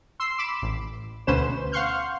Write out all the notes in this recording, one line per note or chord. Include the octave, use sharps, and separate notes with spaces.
C6 E6 C7
B5 D6 E7
A1
D2 B2 C#4 B4 C5 E7
F5 F#5 C6 C#6 F6 G6